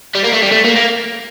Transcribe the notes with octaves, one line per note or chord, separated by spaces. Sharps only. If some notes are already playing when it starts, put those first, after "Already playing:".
G3
A#3
A3
G3
A3
A#3
A#3